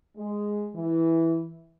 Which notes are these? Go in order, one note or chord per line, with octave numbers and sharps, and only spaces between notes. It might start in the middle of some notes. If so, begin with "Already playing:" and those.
G#3
E3